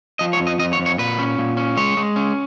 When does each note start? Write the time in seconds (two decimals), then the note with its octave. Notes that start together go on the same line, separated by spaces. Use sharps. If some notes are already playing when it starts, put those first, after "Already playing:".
0.19 F3 D#5
0.33 C#5
0.40 F2
0.47 D#5
0.59 F2 D#5
0.73 C#5
0.80 F2
0.86 C#5
0.99 A#2 B4
1.19 C#4
1.39 A#2
1.57 C#4
1.77 G#3 C#5
1.97 G#3
2.16 C#4